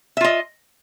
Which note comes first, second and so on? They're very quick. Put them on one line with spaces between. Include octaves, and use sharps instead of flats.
E5 F4 D#5